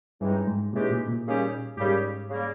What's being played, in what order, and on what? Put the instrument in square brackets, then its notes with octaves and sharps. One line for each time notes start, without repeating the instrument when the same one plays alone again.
[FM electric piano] G2 [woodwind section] C#3 E3 G#3 D#4 G4
[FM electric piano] G#2
[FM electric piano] A#2 [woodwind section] C#3 E3 G#3 D#4 G4
[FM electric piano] A#2
A#2
[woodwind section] D#2 C#3 G3 C#4 G4
[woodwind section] D#2 C#3 G3 C#4 G4 [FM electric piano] G#2
[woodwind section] C#3 G3 A#3